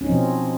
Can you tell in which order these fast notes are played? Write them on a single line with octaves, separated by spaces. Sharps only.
C#4 D#4 C4 F3 B2